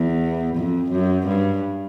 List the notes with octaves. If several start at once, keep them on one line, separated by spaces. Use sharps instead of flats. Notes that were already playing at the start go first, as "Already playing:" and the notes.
Already playing: E2
F2
F#2
G2